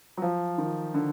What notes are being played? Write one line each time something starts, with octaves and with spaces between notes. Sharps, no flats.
F#3
F3
D#3
D3